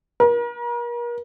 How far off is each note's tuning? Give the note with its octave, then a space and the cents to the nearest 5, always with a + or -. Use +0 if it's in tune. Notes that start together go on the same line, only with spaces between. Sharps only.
A#4 +40